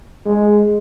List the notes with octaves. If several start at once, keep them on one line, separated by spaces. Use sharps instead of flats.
G#3